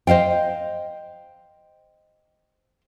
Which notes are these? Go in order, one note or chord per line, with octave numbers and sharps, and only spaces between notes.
C5 D#5 F5 G5